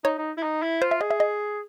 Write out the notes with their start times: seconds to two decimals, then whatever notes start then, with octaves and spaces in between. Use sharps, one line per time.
0.04 D#4 C#5
0.18 D#4
0.37 E4
0.43 D#4
0.62 E4
0.81 F4 C5
0.91 E5
1.01 G#4 D#5
1.11 E5
1.20 D#5